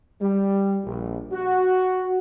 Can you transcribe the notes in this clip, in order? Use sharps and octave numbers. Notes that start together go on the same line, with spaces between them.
G3
A#1
F#4